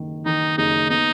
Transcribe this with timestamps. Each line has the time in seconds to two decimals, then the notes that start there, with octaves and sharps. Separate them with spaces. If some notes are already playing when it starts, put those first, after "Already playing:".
Already playing: F#1 D#3
0.25 D#3 D#4
0.58 F#1 D#4
0.89 B3 D#4